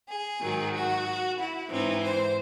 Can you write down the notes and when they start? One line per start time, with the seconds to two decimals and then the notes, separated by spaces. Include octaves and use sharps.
0.09 G#4
0.41 G#2 D#3 F#3
0.74 F#4
1.39 E4
1.70 G#2 E3 C4 D#4
2.03 C5